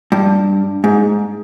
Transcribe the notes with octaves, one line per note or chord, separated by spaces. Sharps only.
G2
G#2